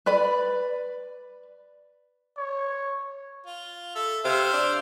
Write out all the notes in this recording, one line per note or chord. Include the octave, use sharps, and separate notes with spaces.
B4 D5 B5
C#5
F4
A4 E5
C3 C5 E5 F5
D4